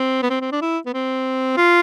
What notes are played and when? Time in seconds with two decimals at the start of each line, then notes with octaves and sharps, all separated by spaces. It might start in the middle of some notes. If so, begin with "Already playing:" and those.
Already playing: C4
0.22 B3
0.30 C4
0.41 C4
0.52 D4
0.62 E4
0.86 B3
0.94 C4
1.57 F4